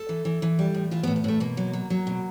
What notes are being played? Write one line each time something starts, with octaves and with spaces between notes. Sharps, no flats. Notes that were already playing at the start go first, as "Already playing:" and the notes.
Already playing: A4
E3
E3
E3
G3
A2
E3 F4
B3
A2
B3
A2 A3
B2 A#3
F#3
F#3
F#3
B2